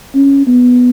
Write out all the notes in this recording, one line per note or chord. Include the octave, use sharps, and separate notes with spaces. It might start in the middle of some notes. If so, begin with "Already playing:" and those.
C#4
B3